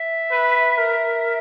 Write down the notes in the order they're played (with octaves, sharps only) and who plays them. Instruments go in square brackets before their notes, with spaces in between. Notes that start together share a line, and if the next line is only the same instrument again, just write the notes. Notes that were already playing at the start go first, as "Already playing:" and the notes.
Already playing: [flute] E5
[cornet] B4
A#4